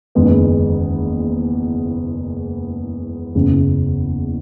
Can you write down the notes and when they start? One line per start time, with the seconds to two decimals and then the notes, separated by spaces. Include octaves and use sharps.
0.15 F#1 E2 D#3 G#3 B3
3.35 F#1 E2 C#3